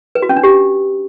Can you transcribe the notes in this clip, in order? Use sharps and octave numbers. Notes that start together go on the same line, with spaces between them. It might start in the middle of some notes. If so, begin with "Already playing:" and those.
B4
F#4
C#4
D4
G4